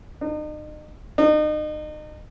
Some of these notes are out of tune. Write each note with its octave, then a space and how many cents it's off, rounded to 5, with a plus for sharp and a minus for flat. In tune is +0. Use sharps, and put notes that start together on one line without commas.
D#4 -40
D#4 -35